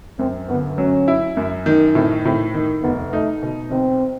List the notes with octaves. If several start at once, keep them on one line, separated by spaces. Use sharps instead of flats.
F#2 C4
G1 B3
F#3 C#4
E4
F#2
D#3
A2 C4
A2 C4
D#3
F1 B3
A3 D#4
B2
B1 C4